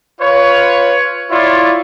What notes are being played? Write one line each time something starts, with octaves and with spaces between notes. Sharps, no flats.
F4 B4 C#5
E4 F4 C#5 D5